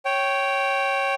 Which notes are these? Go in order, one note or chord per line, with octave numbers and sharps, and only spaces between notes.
C#5 G5